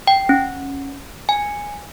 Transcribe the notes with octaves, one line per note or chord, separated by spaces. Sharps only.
G5
C#4
G#5